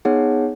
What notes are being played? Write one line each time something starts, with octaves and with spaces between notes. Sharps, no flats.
B3 D#4 G#4 C#5 F#5